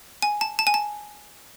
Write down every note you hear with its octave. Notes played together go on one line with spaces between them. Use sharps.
G#5
A5
A5
G#5
A5